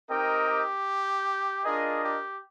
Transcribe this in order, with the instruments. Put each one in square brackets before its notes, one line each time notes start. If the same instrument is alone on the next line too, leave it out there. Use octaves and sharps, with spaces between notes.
[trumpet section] C4 D#4 A#4 D#5 G5 [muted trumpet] G4
[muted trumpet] G4
[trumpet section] D4 F4 A#4 D#5 [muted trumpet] G#4
[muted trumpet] G4